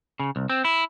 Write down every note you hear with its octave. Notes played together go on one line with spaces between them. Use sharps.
C#3
C2
C4
E4